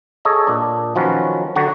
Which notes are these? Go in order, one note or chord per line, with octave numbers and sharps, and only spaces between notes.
G#4 A4 C#5 D#5 G#5
A#2 D4
D#3 F3 F#3 C#4 B4
D3 F#3 F#4